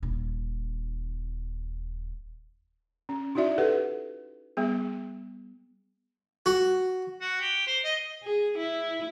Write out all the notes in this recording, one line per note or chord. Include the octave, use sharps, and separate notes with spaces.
D#1 D#4
C#4
D#4 E4 F#4 D5 E5
G4 A4 B4 F#5
G3 B3 G#4
F#4
F#4
G4
C5
D#5
G#4
E4